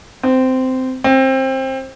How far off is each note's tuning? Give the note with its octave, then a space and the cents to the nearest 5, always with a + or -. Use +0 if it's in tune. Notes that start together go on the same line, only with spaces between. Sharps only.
C4 -15
C4 +20